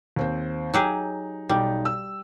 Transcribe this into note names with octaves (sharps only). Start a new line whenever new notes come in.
D#2 C4 C5
F#3 D#4 G4 G#4
B1 G3 D#4
E6